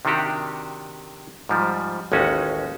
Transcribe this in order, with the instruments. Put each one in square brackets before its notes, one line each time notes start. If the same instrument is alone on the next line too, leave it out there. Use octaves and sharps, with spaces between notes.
[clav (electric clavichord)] C3 D#3 D4 F#4 G4
G#2 F3 G3
A1 D#2 G#3 C#4 D#4 F#4